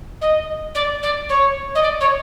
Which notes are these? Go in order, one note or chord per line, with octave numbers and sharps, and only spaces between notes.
D#5
D5
D5
C#5
D#5
D5
C#5